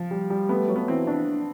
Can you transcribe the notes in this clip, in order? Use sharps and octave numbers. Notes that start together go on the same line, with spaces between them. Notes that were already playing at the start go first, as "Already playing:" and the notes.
Already playing: F3
G3
G3
A3 B3
F#3
B3
E3 C4
D4